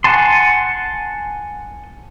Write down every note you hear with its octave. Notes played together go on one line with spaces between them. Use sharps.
F#5 G#5 A5 C6